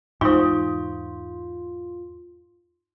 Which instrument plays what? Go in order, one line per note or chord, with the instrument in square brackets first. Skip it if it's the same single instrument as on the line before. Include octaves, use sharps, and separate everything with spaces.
[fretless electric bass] E2 G#2 G#3 [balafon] D#4 C5 [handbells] F4 [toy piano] C#6 D#6